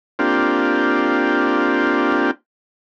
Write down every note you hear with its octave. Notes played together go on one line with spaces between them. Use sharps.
A#3 C4 D4 F4 G4